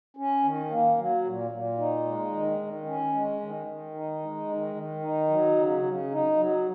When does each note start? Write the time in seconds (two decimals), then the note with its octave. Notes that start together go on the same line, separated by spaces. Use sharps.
0.17 C#4
0.44 D#3
0.69 A#3
0.97 F#3
1.24 A#2
1.51 A#2
1.78 D#4
2.05 G#3
2.32 D#3
2.59 D#3
2.86 C#4
3.13 G#3
3.41 D#3
3.66 D#3
3.94 D#4
4.21 G#3
4.48 D#3
4.75 D#3
5.02 D#4
5.29 F#3
5.56 C#3
5.83 C#3
6.11 D#4
6.36 F#3